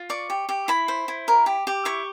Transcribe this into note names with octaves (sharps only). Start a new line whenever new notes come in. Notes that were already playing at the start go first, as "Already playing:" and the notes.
Already playing: F4
D5 C#6
G4
G4
E4 B5
C5
E4
A#4
G4
G4
E4 C#6